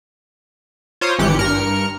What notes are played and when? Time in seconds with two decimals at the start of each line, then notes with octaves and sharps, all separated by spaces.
1.01 F4 C5 C#5 A#5 D#6
1.19 G#1 E3 G4 F#6 C#7
1.39 G2 A#4 F6 C#7